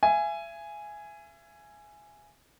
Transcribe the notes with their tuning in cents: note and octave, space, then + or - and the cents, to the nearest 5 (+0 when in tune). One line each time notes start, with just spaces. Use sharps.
E5 +40 G#5 +0